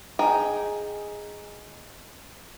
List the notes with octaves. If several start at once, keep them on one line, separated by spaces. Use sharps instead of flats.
D#4 G#4 G5